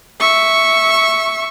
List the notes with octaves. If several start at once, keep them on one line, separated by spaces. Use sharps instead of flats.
E5 C#6